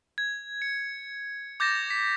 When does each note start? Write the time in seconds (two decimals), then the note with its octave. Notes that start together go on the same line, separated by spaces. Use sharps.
0.18 G#6
0.62 C#7
1.60 D6 G6 A6 A#6 E7
1.90 B6